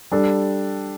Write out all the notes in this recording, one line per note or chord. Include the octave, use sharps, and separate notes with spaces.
G3 D4 A4